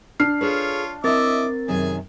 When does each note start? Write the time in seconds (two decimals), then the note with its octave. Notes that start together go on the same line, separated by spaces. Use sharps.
0.20 D4 F6 C7
0.41 F4 G#4 A4 B4 C#5
1.04 C4 E4 A#4 C#5 D#5 E5 D6 A6
1.68 F#2 C3 D#3 G#4 G#5